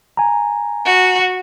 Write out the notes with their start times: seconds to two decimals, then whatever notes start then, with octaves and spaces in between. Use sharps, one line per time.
0.17 G#5 A#5
0.85 F#4